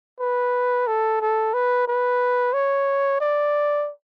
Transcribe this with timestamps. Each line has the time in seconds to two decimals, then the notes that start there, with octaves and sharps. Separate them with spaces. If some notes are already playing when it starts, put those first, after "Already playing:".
0.20 B4
0.87 A4
1.21 A4
1.54 B4
1.88 B4
2.53 C#5
3.21 D5